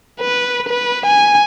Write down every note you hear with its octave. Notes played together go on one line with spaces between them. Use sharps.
B4
B4
G#5